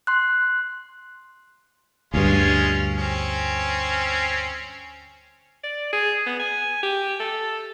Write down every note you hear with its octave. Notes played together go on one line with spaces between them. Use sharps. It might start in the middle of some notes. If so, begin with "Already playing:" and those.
C6 F#6
D2 G2 G#3 C#4 F4
C4 C#4
D5
G#4
B3
G#5
G4
A4